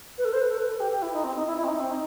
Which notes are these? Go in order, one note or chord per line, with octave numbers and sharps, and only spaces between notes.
B4
A4
C5
B4
A4
B4
A4
G4
G4
E4
D#4
C4
D#4
E4
E4
C4
D#4
C4
D#4